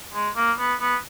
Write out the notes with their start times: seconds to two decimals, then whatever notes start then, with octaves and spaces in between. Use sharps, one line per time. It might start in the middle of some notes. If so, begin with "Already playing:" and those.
0.14 G#3
0.37 A#3
0.58 B3
0.81 B3